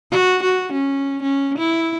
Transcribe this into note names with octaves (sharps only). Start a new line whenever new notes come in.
F#4
F#4
C#4
C#4
E4